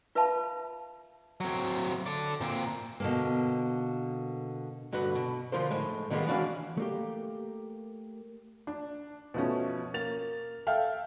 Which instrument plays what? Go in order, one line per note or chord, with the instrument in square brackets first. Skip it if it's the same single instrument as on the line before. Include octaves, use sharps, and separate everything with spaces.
[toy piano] F4 B4 E5 F5 A5 B5
[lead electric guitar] F#3 C4
A4 D5
A#2 C4
[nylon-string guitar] B2 D3 A#3
[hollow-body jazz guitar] G2 D3 F#4 B4 F#5
B2
D3 F3 F4 A#4 C5
A2 G#3
D3 D#3 G3 G#3 A#3 B3
E3 C#4 D4 F#4 F5
A3 A#3 G4
[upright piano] D4
B2 F3 A3 C#4
A#3 A6 F7
A4 E5 F5 G5 F6